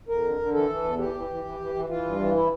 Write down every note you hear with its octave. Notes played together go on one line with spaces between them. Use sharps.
F2 A#4
D3
D3
E3 A4
E3
E2
E3 G4
E3
E3
E3
E3
E3
E3 F4
G2
E3
E4